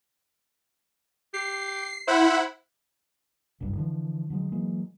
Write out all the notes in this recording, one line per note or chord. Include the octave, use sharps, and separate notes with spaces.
G4 C7
E4 C5 F#5 B5
F#1 C2 G2
D3 E3 F3
D3 F3 F#3 G#3
E3 F#3 G#3 A#3